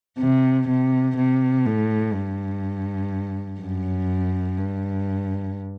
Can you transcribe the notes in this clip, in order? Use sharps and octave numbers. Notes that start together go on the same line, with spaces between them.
C3
C3
C3
A2
G2
F#2
G2